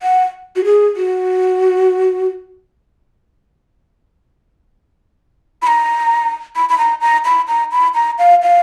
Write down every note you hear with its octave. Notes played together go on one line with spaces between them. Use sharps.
F#5
F#4
G#4
F#4
B5
A#5
B5
B5
A#5
A#5
B5
A#5
B5
A#5
F5
F5